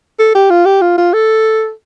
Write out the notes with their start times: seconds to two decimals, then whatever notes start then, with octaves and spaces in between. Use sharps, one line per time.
0.19 A4
0.35 G4
0.50 F4
0.66 G4
0.81 F4
0.98 F4
1.14 A4